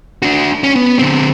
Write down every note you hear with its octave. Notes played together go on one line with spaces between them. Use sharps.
D4 F#4
C#4
B3
D3 C4